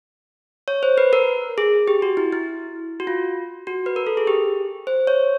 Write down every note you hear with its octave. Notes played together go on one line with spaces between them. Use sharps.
C#5
C5
B4
A#4
G#4
G4
F#4
E4
E4
F#4
F4
F#4
B4
A#4
A4
G#4
G4
C5
C#5